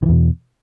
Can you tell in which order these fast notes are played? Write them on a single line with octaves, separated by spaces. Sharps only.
D#3 E3 E2 B2